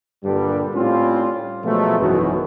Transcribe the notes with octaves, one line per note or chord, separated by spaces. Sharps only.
G2 A#2 D3 G3
A2 G3 C4 C#4 F4
B2 F3 F#3 G#3 A3
G#1 F#2 B2 E3 B3 F#4